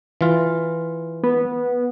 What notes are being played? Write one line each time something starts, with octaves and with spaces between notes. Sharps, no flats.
E3 F4
B3